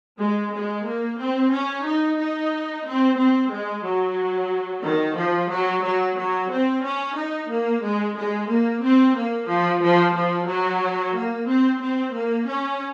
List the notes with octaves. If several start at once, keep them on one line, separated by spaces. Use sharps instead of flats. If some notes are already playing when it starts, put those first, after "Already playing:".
G#3
G#3
A#3
C4
C#4
D#4
D#4
C4
C4
G#3
F#3
D#3
F3
F#3
F#3
F#3
C4
C#4
D#4
A#3
G#3
G#3
A#3
C4
A#3
F3
F3
F3
F#3
A#3
C4
C4
A#3
C#4